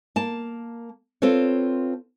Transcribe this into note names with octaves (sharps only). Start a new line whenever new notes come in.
A#3 A5
C4 F4 A4 B4 C#5